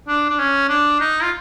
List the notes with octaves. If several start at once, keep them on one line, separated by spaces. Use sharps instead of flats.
D4
D4
C#4
D4
D#4
F4